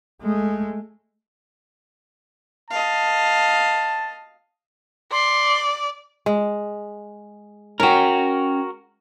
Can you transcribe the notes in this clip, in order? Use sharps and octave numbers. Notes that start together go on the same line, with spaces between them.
G#3 A3
D#5 F5 A5
D5 C6
G#3
C#4 F#4 A#4 G5